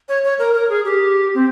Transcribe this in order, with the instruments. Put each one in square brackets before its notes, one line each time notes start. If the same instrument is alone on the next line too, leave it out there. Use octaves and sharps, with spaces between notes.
[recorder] C#5
C#5
A#4
A#4
G#4
G4
C4